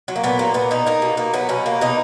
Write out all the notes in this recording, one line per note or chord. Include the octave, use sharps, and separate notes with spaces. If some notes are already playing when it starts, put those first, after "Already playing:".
F#3
A#3
A#2 B3
A#2 A#3
A#2 B3
B2 D#4
A#3 D#4
B2
A#3
F#3 B3
B2 C#4
A#3
B2 D#4